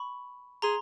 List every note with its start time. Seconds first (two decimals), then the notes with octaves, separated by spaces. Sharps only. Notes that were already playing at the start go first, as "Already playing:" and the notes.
Already playing: B5 C#6
0.62 G#4 A#5 C6